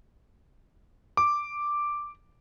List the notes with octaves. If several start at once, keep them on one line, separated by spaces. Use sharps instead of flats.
D6